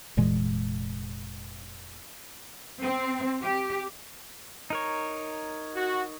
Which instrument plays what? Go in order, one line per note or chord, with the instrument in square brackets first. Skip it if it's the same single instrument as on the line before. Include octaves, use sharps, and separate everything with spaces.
[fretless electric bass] F1 A#2 E3 G#3
[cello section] C4
G4
[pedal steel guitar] D#4 A#4 C#5
[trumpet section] F#4